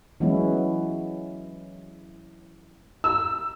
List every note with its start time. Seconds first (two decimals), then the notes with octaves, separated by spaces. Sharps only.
0.20 E3 F#3 G#3 B3 C#4 E4
3.04 E6